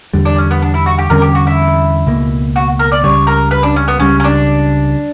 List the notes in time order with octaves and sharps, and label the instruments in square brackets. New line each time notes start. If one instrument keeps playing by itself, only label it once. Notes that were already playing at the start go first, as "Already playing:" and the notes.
[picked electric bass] E2 D3 G3
[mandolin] D4
C#4
B3
D4
E4
F#4
G4
[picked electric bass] E2 D3 G3 C#4 [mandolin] A#4
[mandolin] G4
F#4
E4
[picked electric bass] C#2 B2 A#3
[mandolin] F#4
A#4
D5
[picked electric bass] C#2 C#3 G3 [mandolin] C#5
[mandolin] A#4
B4
D4
C#4
B3
[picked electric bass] C#2 C#3 G3 [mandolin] C#4
[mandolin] C#4
D4